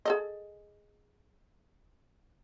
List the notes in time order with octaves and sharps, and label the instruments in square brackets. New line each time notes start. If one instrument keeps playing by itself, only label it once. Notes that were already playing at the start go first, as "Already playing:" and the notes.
[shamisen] G#4 A4 D#5